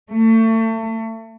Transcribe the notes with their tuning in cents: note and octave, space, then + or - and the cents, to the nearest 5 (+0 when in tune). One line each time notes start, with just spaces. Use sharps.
A3 +30